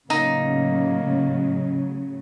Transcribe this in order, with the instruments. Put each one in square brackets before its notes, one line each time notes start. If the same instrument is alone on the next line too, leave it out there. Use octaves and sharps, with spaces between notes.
[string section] A2 C#3 F#3 [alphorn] A#3 [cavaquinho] D#4